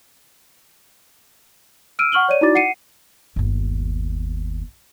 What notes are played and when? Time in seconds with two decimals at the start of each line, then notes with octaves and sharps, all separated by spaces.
1.99 E6 F6 D7 D#7
2.12 F#5 C#6 F6 F#7 G7
2.29 C#5 D5 D#7
2.41 D#4 E4 F#4 D5 D6 A6
2.55 F#5 C7 C#7 D#7
3.36 G1 D#2